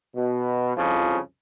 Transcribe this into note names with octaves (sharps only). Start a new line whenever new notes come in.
B2
C2 F2 C#3 F3